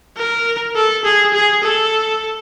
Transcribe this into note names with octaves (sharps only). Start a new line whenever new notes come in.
A#4
A4
G#4
G#4
A4